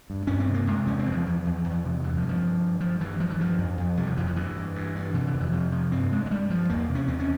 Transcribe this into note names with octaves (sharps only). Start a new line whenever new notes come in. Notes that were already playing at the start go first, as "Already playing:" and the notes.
G2
G2 C#4
C4
C3
A#3
C3 G#3
E2 C#4
C4
E2
F3
E2
E2
E2
C3
G2 E3
F3
G2
F3
G2
G2
G2 F3
G2 E3
G2 F3
E3
G2 F3
F2
F2
C3 G3
F3
F2 E3
F3
G2 E3
G2
G2
G2
C3 E3
E3
F2
E3
C3 F3
C3 F3
G2 C4
G2 G#3
G#3
G2 G3
G2 F3
E2 A#3
C3
C#4
E2 C4
C#4